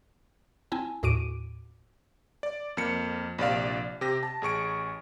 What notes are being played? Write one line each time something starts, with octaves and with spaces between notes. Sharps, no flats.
C4 E4 G#5 A5
D#2 A2 F#4 D6 D7 D#7
D5
F2 A#3 C#7
A#1 C3 D5 F5
C3 G4 A#6
A5
A1 G#4 C#6 D7